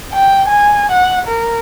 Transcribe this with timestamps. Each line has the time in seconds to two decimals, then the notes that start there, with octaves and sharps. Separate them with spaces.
0.12 G5
0.48 G#5
0.91 F#5
1.27 A#4